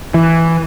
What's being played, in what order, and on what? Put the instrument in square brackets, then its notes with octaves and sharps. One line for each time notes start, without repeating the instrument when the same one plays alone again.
[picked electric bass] E3